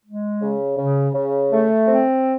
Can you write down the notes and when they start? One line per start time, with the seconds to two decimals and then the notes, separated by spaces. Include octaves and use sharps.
0.04 G#3
0.41 C#3
0.77 C#3
1.14 C#3
1.51 A3
1.88 C4